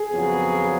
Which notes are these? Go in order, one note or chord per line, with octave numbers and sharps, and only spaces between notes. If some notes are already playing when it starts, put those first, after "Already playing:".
Already playing: G#4
F2 C#3 F#3 B3